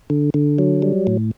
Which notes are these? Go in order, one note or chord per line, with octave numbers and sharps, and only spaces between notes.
D3
D3
F#3
G3
A2